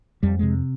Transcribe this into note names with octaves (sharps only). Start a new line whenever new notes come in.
F2 G3
C3 G#3